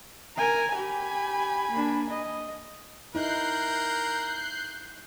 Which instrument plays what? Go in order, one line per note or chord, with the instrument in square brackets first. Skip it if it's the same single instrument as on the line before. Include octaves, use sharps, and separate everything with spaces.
[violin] A#4 [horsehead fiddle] G#5
[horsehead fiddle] G4 [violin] G#5 B5
[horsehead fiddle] A#3 D4
D#5
[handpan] D#4 E4 [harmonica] A#4 [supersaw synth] F#6 G6 C7